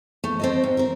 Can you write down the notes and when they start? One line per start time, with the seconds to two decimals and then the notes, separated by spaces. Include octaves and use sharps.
0.24 A3
0.39 C4 A4 D#5
0.64 G#2
0.77 C4 A#4